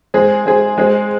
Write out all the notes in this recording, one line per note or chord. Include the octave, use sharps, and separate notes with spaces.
G#3 C4 G#4
G#3 C4 G#4
G#3 C4 G#4